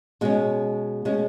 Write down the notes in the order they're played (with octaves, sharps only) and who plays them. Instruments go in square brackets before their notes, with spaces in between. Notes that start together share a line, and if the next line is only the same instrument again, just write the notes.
[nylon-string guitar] B2 G#3 C#4
B2 G#3 C#4